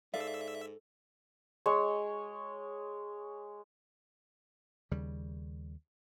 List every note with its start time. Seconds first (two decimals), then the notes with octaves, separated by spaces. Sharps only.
0.14 G#2 A4 D5 E5 F5
1.66 G#3 C#5
4.91 D#2 C#3 G3